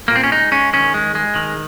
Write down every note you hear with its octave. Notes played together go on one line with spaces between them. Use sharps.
A#2 A#3
C4
C#4
G#3 D#4
G#3 C#4
D#3 C#4
G#3
G#3
D#3